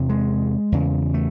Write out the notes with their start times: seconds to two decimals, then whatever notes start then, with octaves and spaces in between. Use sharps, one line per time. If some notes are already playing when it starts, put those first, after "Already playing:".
Already playing: E2 C3
0.09 G#3
0.72 E2 C#3
1.14 A3